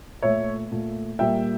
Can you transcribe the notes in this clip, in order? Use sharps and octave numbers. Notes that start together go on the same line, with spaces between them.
A#2 A3 C#5 E5
A#2 A3
A#2 G3 A#3 E5 G5